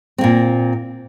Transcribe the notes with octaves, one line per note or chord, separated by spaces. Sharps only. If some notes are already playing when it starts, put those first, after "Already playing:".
A#2 A#3 C4